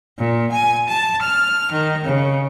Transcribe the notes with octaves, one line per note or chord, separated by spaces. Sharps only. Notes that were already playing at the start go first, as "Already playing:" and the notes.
A#2
G#5
A5
F6
D#3
C#3